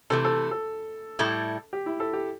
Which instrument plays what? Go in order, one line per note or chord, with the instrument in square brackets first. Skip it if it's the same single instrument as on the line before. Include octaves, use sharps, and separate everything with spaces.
[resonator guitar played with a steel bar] C3 E3 A3 [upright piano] A4
[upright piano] A4
A4
[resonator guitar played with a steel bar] A2 G3 E4 A4
[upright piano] G4
E4
A4
G4